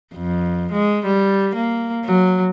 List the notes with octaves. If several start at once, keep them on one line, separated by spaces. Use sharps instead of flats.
F2
G#3
G3
A#3
F#3